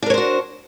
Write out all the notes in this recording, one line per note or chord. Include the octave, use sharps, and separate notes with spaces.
D4 F#4 A#4 C5 C#5